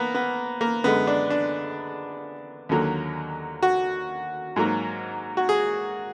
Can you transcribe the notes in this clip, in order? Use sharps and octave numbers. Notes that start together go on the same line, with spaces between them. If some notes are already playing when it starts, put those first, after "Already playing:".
Already playing: A#3 B3
B3
A#3
F#2 D3 G#3 B3
D4
D4
D#2 D3 F#3 A#3
F#4
G#2 F#3 A#3
F#4
G#4